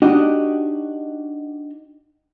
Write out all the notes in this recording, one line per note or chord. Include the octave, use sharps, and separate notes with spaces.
D4 D#4 F#4 G4 D#5